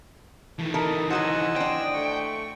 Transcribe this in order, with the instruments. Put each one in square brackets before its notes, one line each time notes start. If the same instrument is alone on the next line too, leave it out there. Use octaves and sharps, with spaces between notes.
[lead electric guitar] D#3 E3 [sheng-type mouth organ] A3 A5
[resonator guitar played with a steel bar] E4 A4 A#4 [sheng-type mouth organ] D#5
[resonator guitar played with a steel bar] F#3 F#4 C5 [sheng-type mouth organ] D#5 G#5 E6 [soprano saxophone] F#5
[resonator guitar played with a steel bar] D4 C5 [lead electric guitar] G5
[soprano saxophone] A3 [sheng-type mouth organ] C#6